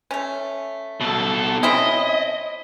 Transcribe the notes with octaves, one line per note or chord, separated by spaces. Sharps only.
A3 C#4
B2 A4
C4 C#4 E4 D#5